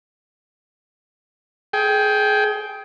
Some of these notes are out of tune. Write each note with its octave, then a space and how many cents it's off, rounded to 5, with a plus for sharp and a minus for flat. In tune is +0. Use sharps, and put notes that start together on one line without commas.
G#4 +25 G5 +0